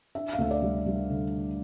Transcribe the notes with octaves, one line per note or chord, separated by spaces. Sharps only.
D4 E5
F5
D2 E5
D5
G3
G3
D3